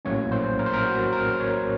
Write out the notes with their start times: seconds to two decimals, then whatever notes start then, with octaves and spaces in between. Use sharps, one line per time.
0.05 A#1 A2 F#3 A#3 C#4 C#5
0.32 C5
0.59 A#4
0.66 C5
0.74 A#4
0.86 F#4
1.13 A#4
1.40 C#5